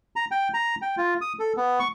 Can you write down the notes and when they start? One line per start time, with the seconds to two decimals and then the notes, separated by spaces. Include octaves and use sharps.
0.16 A#5
0.31 G5
0.54 A#5
0.82 G5
0.97 F4
1.21 D#6
1.39 A4
1.57 B3
1.79 C#6